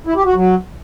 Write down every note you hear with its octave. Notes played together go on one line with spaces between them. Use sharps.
E4
G4
F#4
F#3